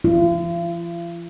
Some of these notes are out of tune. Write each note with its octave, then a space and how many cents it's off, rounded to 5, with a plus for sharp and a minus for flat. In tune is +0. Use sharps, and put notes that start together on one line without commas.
F4 -45